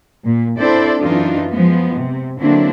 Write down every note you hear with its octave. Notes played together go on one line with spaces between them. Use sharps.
A#2
C4 D4 E4 A4 C5 D5
F#2 E3 D4 D#4 F4
F3 G#3 B3
C3
D3 F#3 A#3 C4 D4 E4